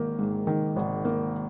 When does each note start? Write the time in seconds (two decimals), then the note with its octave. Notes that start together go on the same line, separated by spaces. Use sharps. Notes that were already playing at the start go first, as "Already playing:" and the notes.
Already playing: G#1 D#3 A#3
0.19 G#2
0.47 D#3
0.76 G#1
1.05 A#3